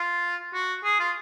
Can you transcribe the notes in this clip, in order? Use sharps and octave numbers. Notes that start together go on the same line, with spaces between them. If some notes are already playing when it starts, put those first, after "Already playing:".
Already playing: F4
F#4
G#4
F4